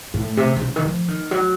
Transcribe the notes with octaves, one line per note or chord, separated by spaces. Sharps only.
A2
C3
C3
C#3
D#3
F3
D#3
F#3